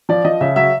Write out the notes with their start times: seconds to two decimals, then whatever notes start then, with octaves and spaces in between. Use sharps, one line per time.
0.09 F3 D5
0.25 F3 D#5
0.41 C#3 E5
0.56 F#3 E5